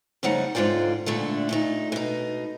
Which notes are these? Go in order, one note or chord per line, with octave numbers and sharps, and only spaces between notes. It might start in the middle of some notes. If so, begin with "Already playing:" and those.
F2 C#3 G3 A3 D#4 F#5
G#2 D3 F4 D5 G5
A#2 D3 A3 D4
A#2 A3 D#4
B2 D#4